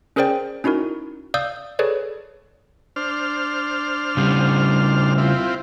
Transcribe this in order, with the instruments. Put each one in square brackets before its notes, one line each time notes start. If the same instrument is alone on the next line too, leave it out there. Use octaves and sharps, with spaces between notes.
[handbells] C#4 G#4 A#4 C5 D5 G5
C#4 D#4 E4 F#4 A#4
D5 F5 D#6 E6 G6
G#4 A4 B4 C#5 D5
[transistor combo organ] D4 C5 F6
[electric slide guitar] C#3 G3
[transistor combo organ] C4 E4 F4